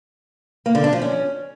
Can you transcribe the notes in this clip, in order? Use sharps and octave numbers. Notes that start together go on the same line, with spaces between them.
A#3
D3
D4
F3
C#4